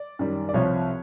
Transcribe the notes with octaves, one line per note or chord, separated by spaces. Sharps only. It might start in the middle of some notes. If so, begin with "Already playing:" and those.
Already playing: D5
F#2 D#3 G3
D5
C2 C3 F3 C#5